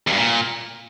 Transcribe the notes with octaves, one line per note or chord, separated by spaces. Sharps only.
E2
G2
A#2